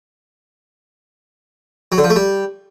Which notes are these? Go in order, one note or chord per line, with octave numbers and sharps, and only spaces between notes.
F#3
D3
F3
A3
G3